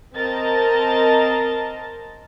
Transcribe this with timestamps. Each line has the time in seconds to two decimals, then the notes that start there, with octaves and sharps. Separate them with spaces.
0.15 C4 A#4 D#5 A5 A6